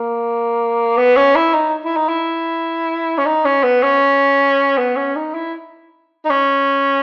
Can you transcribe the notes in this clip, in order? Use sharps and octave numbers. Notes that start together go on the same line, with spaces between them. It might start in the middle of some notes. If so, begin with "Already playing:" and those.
Already playing: A#3
B3
C#4
E4
D#4
E4
D#4
E4
C#4
D#4
C#4
B3
C#4
B3
C#4
D#4
E4
D#4
C#4